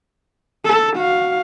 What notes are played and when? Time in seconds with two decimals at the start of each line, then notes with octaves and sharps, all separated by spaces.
0.65 A4
0.97 F#4 F5